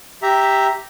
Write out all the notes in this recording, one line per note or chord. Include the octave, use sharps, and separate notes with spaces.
G4 E5 A#5